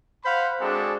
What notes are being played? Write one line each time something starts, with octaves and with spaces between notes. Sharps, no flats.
C5 F5 F#5 B5
G#3 C4 D4 F#4 G#4 A4